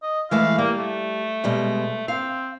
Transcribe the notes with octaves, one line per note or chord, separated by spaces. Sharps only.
D#5
E3 G#3 A3 F5
G3 A#3
A3
B2 G3 G#3
C4 F5